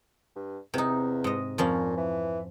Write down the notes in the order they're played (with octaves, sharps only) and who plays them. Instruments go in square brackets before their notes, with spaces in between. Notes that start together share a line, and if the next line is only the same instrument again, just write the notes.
[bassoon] G2
[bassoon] E2 [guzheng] C3 D#4
[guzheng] G#2 D#5
[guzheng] F2 F3 C#4 [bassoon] A#2
[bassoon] E3